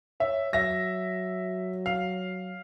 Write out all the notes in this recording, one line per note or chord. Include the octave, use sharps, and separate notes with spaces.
C#5 E5
F#3 E5 A#6
F5